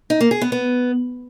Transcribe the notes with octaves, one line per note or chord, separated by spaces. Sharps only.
D#4
A#3
G#4
B3
B3